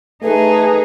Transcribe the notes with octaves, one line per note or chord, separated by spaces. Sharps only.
A3 D#4 G#4 B4